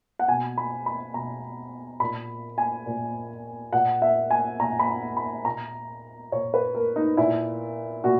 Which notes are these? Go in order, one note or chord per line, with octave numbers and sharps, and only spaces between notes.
F#5
B2 G#5
B5
B5
B2 A#5
A#2 B5
G#5
A#2
A#2 F#5
E5
G#5
A#2 A#5
B5
A#5
B5
A#2 A#5
A#2 C#5
B4
A#4
D#4
A#2 E4
A#2 F#4